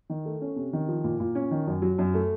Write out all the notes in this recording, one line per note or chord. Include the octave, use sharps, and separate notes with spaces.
D#3
A3
C#4
C3
D#3
F3
A#2
A#2
C#4
D#3
F#2
F#3
F#2
A3